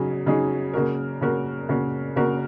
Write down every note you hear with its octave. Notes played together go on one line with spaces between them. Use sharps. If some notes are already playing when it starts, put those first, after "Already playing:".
Already playing: C#3 F#3 D#4 G#4
C#3 F#3 D#4 G#4
C#3 A#3 F#4 A#4
C#3 A#3 F#4 A#4
C#3 A#3 F#4 A#4
C#3 A#3 F#4 A#4